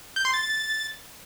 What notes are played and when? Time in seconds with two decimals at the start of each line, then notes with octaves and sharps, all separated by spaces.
0.16 G6
0.25 C6
0.34 A6